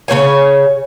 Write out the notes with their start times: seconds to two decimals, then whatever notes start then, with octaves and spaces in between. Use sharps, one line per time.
0.08 C#3 C4 C#5 G#5